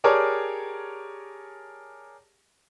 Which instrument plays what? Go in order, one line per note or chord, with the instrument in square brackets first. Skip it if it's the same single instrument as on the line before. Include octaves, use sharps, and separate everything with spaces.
[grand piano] G4 G#4 A#4 C#5 D5 A5